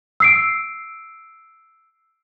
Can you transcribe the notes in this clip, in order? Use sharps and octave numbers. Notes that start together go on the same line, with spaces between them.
E6 C7 D7